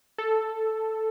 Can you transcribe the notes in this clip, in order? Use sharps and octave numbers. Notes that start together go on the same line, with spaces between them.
A4